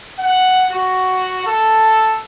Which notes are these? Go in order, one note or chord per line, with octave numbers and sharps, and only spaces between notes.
F#5
F#4
A4